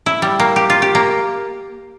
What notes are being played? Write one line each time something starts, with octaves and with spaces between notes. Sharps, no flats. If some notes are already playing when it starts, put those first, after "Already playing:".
E4
G3
A#3
G4
F4
G4
A#3